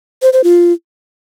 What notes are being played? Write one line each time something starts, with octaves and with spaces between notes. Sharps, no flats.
C5
C5
F4